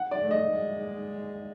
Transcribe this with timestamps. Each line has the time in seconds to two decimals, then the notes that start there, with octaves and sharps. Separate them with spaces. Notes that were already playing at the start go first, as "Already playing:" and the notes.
Already playing: F#5
0.11 D5
0.21 A3
0.31 D#5
0.51 G#3